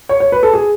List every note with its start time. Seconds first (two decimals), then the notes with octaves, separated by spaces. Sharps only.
0.09 C#5
0.20 C#5
0.32 B4
0.43 A4
0.54 G#4